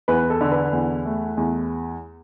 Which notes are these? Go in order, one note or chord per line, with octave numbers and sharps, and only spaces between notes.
E2 B4
A4
D3
B4
E2
A3
E2